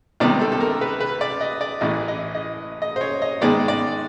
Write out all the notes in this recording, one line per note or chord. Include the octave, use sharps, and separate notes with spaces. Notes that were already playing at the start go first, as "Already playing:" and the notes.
C#2 C3 D#3 G3 B3 D5
A4
A4
A#4
B4
B4
D5
D#5
D5
A1 A2 E3 D#5
D#5
D#5
D#5
C5
C#5
D#5
G#2 D#3 G#3 B3 D5
D5